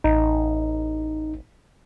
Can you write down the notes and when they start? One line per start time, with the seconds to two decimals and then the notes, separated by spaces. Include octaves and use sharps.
0.04 A1 D#4